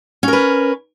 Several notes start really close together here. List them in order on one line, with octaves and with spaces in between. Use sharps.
C#4 A#4 B4